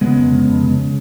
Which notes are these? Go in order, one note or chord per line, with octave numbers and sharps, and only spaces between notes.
C#3 G#3 B3
F2
C#3
F2
C#3